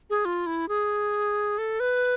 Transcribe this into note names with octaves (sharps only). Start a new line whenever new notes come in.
G#4
F4
E4
G#4
A4
B4